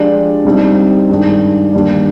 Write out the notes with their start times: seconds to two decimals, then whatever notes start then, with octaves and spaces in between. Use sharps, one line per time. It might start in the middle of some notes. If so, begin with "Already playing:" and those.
Already playing: F3 G#3 D4 G4 D5
0.44 C2 C3 G3 C4 D#4
1.09 G2 D#3 G#3 D4 G#4
1.73 D#2 D3 G3 D4